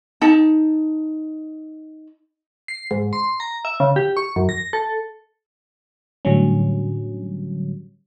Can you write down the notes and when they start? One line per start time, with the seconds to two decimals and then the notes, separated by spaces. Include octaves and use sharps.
0.21 D#4 A5
2.68 C7
2.91 G#2
3.13 C6
3.40 A#5
3.65 E5
3.80 C#3
3.96 G4
4.17 C#6
4.36 F#2
4.49 A#6
4.73 A4
6.25 A2 D3 F#3 G3 C#4